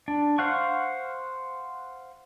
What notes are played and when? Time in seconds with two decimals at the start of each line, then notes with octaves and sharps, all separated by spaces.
0.08 D4
0.38 C5 F5 F#5 C#6